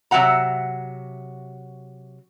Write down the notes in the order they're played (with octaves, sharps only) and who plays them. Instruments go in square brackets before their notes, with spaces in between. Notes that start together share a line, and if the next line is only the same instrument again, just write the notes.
[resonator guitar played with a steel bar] C3 F#3 E5 F#5 A#5